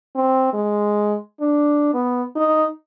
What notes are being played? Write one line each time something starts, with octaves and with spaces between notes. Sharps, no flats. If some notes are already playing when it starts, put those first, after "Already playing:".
C4
G#3
D4
B3
D#4